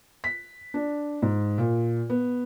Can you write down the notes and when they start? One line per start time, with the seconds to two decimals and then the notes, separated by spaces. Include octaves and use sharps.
0.24 B6
0.74 D4
1.22 G#2
1.58 A#2
2.10 B3